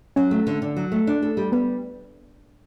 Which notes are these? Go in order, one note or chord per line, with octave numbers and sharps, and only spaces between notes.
F#3 C#4 C#5
A3
D3
D3
F#3
A3
D4
A4
G3
G3 B3 B4